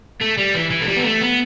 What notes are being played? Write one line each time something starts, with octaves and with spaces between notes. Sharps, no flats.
A3
G3
E3
E3
A3
G3
B3
A3
B3